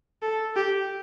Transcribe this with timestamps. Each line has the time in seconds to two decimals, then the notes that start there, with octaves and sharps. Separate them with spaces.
0.22 A4
0.56 G4